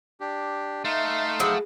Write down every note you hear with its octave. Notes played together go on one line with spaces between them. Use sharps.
D4 G4
A3 D#4 E5 F5 C6
F3 F#3 E4 G#4